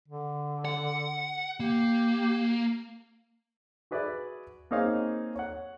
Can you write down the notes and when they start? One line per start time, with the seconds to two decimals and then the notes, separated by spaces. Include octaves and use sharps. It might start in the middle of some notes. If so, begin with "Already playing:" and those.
0.08 D3
0.65 F#5
1.60 A#3 G4
3.91 F#4 G#4 B4 D5 E5
4.71 A#3 C4 D#4 G#4 C#5 F5
5.36 C#5 F#5